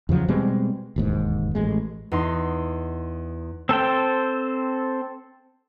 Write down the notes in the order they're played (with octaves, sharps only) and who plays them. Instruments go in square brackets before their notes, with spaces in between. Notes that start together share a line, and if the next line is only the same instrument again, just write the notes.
[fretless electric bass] E2 C#3 F3 F#3
B2 G3 G#3 C4
E1 D#2 G#2
A1 G#3
[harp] E2 D#4 C6
[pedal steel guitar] C4 A4 C5 G5